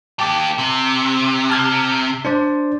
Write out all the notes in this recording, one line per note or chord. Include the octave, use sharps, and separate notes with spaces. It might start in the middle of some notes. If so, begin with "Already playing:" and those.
A#3 G4 A5 D6
C3
A5 F6 G#6
D4 C5 D5